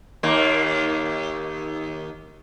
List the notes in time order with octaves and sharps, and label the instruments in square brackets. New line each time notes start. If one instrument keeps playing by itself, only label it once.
[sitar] D#2 A#3